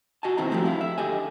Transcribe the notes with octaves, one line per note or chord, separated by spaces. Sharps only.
F#4 D#5 G#5 A5
B1 D#3 E3 C4 E4 A#5
F3 A3 C4 E4 F#4 G4
E4 F5
E5
D2 G4 A4 D#5 G#5